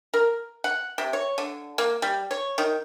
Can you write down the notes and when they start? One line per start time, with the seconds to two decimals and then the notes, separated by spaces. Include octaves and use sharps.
0.14 A#4
0.64 F#5
0.98 C3
1.13 C#5
1.38 D3
1.78 A#3
2.02 G3
2.31 C#5
2.58 D#3